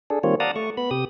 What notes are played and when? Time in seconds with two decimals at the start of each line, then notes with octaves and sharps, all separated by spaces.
0.10 D4 G#4 A4
0.23 D#3 G3 A#3 C4 F4 C#5
0.40 D5 F5 F#5 A5 A#5 D#6
0.56 A3 C#6
0.77 B3 B5
0.91 C3 G4 D#6